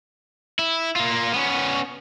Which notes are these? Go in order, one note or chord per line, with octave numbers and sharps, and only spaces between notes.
E4
A#3 F4
B3 C#4